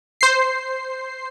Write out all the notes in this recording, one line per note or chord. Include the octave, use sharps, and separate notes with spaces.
C5 C7